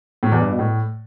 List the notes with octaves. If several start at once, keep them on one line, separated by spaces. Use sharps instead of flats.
A2
E2
G2
B2
A2